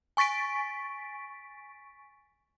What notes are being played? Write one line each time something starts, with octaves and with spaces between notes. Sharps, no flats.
G#5 C#6 A6 B6 D7